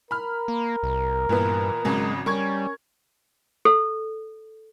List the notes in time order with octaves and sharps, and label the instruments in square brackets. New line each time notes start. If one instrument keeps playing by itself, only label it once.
[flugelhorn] A#4 [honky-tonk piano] B5 F6
[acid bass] A#3
C2
[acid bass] G2 [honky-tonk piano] A#2 E3 B3
[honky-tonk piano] G#1 C#3 F#3 [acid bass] G#3
[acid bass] G3 [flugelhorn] C#4 [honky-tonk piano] A#4 C#6 G#6
[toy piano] A4